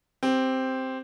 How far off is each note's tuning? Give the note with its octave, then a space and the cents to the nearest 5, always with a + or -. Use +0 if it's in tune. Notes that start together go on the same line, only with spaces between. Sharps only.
C4 +0 G4 +0